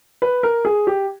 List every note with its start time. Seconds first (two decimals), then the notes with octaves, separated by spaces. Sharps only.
0.22 B4
0.43 A#4
0.65 G#4
0.87 G4